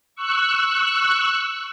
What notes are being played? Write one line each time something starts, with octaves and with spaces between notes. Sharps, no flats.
C#6 E6 F#6